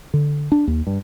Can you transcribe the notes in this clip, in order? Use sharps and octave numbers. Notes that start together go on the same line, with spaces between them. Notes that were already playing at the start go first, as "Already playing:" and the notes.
D3
D4
D#2
G2